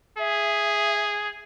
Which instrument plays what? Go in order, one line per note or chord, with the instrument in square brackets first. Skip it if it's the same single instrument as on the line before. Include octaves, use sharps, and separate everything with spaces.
[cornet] G#4 [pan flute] E5